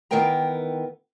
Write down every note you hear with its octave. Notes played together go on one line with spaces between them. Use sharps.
D#3 E3 B3 A#4 G5 A#5